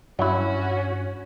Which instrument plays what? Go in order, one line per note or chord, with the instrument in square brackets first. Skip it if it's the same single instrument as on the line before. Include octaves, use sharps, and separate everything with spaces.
[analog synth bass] G2 [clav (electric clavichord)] F#3 E4 [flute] C#4 [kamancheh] F#4